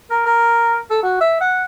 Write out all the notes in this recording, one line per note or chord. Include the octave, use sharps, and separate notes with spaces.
A#4
A#4
A4
F#4
E5
F#5